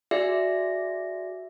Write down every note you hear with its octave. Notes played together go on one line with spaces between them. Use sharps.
F#4 G#4 D5 E5